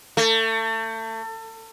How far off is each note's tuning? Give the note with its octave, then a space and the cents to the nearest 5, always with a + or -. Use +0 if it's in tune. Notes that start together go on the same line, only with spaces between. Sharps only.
A3 +30